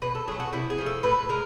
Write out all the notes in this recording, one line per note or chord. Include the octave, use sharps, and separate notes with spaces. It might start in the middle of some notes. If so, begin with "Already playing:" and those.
B2 B4
A4
F#3 A3 G#4
F#4
C3 E4
G#4
F3 A3
A4
A2 B4
G#3 A#4